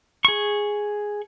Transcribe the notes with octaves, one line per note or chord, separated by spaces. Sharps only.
G#4 C#6